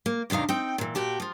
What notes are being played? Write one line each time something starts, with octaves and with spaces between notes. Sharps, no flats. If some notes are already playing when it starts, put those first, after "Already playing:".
A#3
E2 C3 D4 D#4 F5
C4 D#4 G5
A#2 E3
A#2 F#4 G4 A5
F3 F4